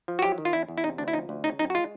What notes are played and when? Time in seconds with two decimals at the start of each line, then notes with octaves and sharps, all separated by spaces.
0.08 F3
0.19 F#4
0.22 F#3 G4
0.38 D#3
0.45 F4
0.53 E2 E4
0.68 E2
0.78 E4
0.83 C3 D#4
0.98 D2 D4
1.08 E4
1.13 F3 D#4
1.29 D2
1.44 C#3 D#4
1.59 F#2 D#4
1.70 F#4
1.75 G#3 F4